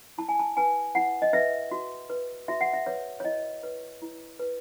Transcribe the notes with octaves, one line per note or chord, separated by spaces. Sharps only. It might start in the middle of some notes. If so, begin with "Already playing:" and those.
E4 A5
G#5
A5
B4 G#5
E4 F#5
D#5
B4 E5
F#4
B4
F#4 E5
F#5
E5
B4 C#5
C#5
E4 D#5
B4
E4
B4